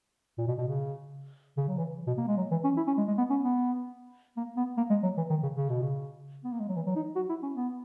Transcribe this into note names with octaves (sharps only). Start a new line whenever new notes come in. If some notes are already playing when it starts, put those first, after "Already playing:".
A#2
B2
B2
C#3
C#3
F#3
E3
B2
A#3
G#3
F#3
E3
C#4
E4
C#4
G#3
G#3
B3
C#4
B3
A#3
B3
A#3
G#3
F#3
E3
D#3
C#3
C#3
B2
C#3
B3
A#3
G#3
F#3
E3
F#3
D#4
F#4
E4
C#4
B3